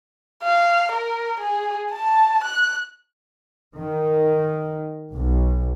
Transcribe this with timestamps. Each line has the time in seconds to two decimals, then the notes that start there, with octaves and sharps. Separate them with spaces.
0.43 F5
0.92 A#4
1.40 G#4
1.93 A5
2.44 F#6
3.76 D#3
5.13 B1